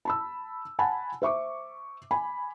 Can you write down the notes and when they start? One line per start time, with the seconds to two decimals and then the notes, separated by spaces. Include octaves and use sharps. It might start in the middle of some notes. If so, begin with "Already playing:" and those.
0.05 A5 B5 E6
0.79 F#5 G#5 A5 B5
1.22 C5 E5 C#6 D6
2.11 G#5 B5